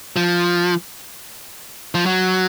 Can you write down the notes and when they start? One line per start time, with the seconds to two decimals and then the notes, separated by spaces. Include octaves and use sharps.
0.16 F3
1.95 F3
2.06 F#3